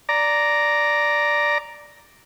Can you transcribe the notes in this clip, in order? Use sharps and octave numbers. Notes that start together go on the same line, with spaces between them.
D5 A#5